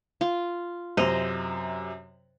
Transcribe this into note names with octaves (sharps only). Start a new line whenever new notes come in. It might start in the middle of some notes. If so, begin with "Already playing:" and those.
F4
F#2 C3 C5 D#5 F7